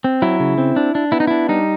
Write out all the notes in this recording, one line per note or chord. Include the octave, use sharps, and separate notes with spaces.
C4
F#3 E4
C#3
C4
D4
D4
B3 E4
D#4
D4 E4
G3 D#4